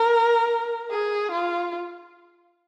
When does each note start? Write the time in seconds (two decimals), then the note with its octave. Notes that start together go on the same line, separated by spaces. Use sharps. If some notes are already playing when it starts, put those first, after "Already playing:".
Already playing: A#4
0.91 G#4
1.31 F4